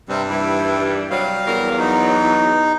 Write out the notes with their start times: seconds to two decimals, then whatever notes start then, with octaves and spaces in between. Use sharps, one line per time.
0.09 G2 C3 G3 C4
0.30 D#2 E3 G3 E4
1.10 C3 F#3 G3 F5
1.47 E2 F#3 A#4
1.79 F#3 D#4